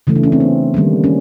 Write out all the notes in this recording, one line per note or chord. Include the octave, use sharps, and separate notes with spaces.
C#3 E3 A3
D4
C#4
C4
B3
D#3 G3 A#3
C#4